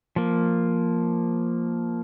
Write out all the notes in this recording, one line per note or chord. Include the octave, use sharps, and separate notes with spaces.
F3 A#3